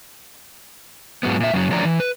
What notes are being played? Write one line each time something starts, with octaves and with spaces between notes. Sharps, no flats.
G#2 F#3 B3
A#2 E5
F#2 C#3 F#3
D3 F3 A3 C#4 D5 A#5
E3
B4